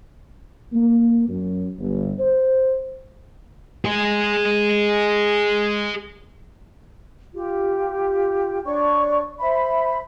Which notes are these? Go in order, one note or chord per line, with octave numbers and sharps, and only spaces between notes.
A#3
F#2
G1
C5
G#4 D#5
F4 G4
D4 C#5 D5 C#6
C5 E5 B5